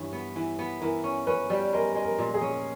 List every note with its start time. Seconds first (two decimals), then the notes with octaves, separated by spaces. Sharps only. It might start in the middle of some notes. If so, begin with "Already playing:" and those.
Already playing: G2 E3 C#5
0.13 B3
0.36 E3
0.59 B3
0.81 E3 A#4
1.04 C#4
1.27 C#4 B4
1.50 G3
1.73 G#3 A#4
1.95 G#3
2.03 A#4
2.19 A#2
2.34 G#4
2.41 C#4